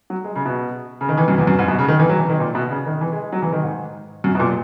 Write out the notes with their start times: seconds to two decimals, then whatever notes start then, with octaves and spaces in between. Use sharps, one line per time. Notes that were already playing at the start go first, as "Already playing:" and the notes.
0.10 F#3
0.24 G#3
0.36 C#3
0.45 B2
1.01 C#3
1.09 D#3
1.17 E3
1.28 F#2
1.38 E2
1.47 F#2
1.59 G#2
1.68 B2
1.79 C#3
1.88 D#3
1.99 E3
2.09 F#3
2.19 E3
2.29 D#3
2.40 A#2
2.55 B2
2.71 C#3
2.86 D#3
3.01 E3
3.12 G#3
3.22 G#3
3.32 F#3
3.42 E3
3.52 D#3
3.63 G#2
4.24 F#2
4.35 B2
4.40 A#2